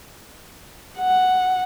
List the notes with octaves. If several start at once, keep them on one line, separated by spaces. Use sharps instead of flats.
F#5